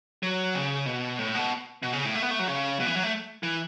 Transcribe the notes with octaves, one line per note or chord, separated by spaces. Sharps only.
F#3
C#3
B2
A2
B2
B2
C#3
A2
A3
B3
A3
F#3
C#3
B2
E3
F#3
A3
E3